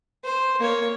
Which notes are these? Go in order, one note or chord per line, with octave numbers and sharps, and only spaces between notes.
C5
A#3 C#5